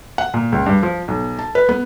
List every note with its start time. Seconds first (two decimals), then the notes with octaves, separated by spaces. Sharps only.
0.18 F#5
0.34 A#2
0.52 C#2
0.66 G2
0.83 F3
1.08 B1
1.39 A5
1.55 B4
1.69 B3